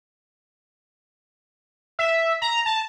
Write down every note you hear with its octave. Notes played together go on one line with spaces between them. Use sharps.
E5
A#5
A5